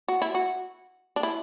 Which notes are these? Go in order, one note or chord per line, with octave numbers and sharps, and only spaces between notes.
F#4
E4
F#4
D4
E4